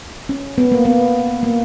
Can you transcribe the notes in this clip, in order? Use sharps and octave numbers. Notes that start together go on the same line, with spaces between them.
C#4
B3
A#3
B3
A#3